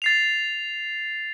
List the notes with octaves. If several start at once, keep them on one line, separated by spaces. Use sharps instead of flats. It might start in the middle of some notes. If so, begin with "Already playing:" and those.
A6 C7 F7